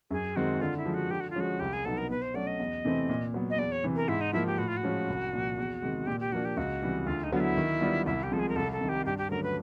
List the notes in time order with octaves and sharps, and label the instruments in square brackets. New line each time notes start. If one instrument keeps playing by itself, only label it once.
[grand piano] F#2 [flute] G#4
[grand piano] D#3 G#3 C4 [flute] F#4
[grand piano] D3 [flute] F4
[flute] E4
[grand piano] F3 G#3
[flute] F#4
[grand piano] D3 [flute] G4
[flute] F#4
F4
[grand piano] F3 G#3 C#4 [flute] F#4
[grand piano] C2 [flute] G4
[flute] G#4
[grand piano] B2 F#3 B3 D#4 [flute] A4
[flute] A#4
[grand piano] B2 [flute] B4
[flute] C5
[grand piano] F#3 A3 C#4 F#4 [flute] D5
[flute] D#5
[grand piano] E2
C3 E3 A3 C4
A#2
F#3 B3
[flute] D#5
[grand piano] E2 [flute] D5
[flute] C#5
[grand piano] C3 E3
[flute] A#4
[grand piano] G#2 [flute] E4
[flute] D#4
[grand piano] F3 A#3 [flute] E4
[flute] G4
[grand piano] A2 [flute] F#4
[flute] F4
F#4
[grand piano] F3 G#3 C#4 F4
C2
A#2 F3
E2
C3 D#3 G#3
[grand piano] A#2 [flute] G4
[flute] G4
[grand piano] F3 A#3 D4 [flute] F#4
[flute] G4
[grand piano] C#2 [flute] F#4
[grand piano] C3 E3 G3
[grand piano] D2 [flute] F4
[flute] D#4
[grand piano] D3 F#3 B3 [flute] F4
[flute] E4
[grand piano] D#3
G3 B3 D4 F4
[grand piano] C2 [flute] E4
[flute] G4
[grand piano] C3 F3 G#3 [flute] A4
[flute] G#4
A#4
[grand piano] C2 [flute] A4
[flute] A4
[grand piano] C3 D#3
[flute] G4
[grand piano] G2 [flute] G4
[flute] G4
[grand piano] D3 F#3 A3 C#4 [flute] A#4
[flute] B4